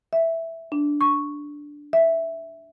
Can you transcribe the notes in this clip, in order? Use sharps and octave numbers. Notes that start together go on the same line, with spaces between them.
E5
D4
C#6
E5